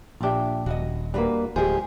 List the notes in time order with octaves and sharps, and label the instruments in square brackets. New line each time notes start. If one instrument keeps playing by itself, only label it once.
[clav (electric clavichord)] A#1 D4 [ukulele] F4 G4 E5
[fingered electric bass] D#1 [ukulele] F#4 D#5
[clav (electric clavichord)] G3 A#3 [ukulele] D4 F#4 B4
[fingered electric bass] D1 [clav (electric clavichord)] G#3 F4 C5 [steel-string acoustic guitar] G4 G#4